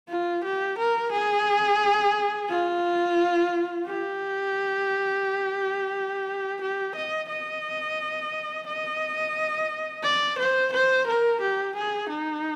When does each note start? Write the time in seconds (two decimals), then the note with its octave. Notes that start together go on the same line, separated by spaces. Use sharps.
0.09 F4
0.44 G4
0.78 A#4
1.12 G#4
2.50 F4
3.86 G4
6.61 G4
6.96 D#5
7.29 D#5
8.67 D#5
10.03 D5
10.38 C5
10.73 C5
11.07 A#4
11.41 G4
11.75 G#4
12.09 D#4